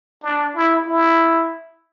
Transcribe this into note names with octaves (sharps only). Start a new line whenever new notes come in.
D4
E4
E4